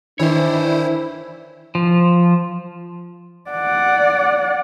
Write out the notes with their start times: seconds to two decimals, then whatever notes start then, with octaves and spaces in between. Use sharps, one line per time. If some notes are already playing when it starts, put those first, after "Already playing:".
0.19 D#3 E3 D4 E4 C5 C#5
1.75 F3
3.51 D5 F#5